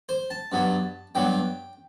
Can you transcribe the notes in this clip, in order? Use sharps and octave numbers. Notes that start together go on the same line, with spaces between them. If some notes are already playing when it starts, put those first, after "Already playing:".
C5
A5
G2 F#3 B3
G2 F#3 B3 G5